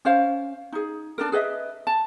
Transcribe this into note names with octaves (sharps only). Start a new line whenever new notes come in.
C#4 C5 F5
D#4 G#4
D4 A4 A#4
G#4 B4 D#5 E5
A5